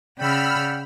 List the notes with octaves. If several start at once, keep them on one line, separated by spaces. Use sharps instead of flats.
C#3 D5 F#5 G5 B5 E6 F6